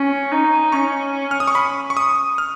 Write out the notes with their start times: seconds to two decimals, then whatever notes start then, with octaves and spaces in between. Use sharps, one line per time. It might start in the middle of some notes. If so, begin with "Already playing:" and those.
Already playing: C#4
0.32 D#4
0.72 C#4 C#6
1.31 F6
1.40 D#6
1.47 C#6
1.55 B5
1.90 C#6
1.97 D#6
2.38 F6